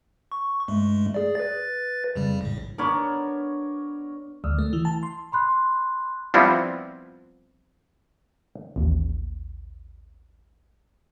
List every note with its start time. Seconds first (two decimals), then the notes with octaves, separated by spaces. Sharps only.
0.32 C#6
0.68 G2 G#3 A3
1.14 G#4 D5
1.35 B4 A6
2.15 F2 C#3 G3
2.41 A#1 A2
2.78 B3 D4 A#4 C#5
4.44 D2
4.59 A3
4.73 E3
4.85 A5
5.03 C6
5.32 B5 C6 F#6
6.34 F3 G3 B3 C4 E4 F4
8.76 A1 D#2